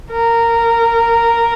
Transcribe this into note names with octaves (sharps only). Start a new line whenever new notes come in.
A#4